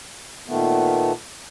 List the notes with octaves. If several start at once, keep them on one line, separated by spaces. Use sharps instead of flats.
A#2 D#3 A3 B3